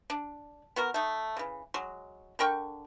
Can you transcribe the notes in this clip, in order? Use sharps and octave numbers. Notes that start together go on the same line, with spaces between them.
D4
B3 F#4 A#4
A3 D#4
C#3 E3
F#3 G#3
D3 A#4 G5 C#6